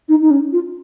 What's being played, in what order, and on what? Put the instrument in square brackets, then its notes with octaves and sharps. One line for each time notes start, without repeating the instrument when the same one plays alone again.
[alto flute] D#4
D#4
C#4
F4